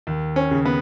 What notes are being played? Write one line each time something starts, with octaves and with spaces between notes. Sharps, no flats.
D#2
C#4
C#3
B3